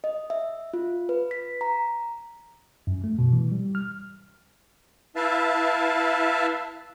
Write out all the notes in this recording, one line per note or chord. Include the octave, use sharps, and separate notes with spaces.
D#5
E5
F4
B4
B6
A#5
F#2
A3
B2
E3
G3
F6
E4 B4 E5 F5 A5